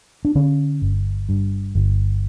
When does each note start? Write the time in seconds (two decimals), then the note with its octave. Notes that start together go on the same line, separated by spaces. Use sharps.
0.25 D4
0.35 D3 C#4
0.82 G1
1.29 G2
1.75 G1